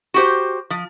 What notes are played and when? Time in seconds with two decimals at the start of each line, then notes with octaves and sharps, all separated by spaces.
0.14 F#4 G4 C5
0.70 F3